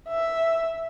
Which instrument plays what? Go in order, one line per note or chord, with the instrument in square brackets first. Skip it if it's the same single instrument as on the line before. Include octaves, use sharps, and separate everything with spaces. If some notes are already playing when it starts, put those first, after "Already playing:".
[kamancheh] E5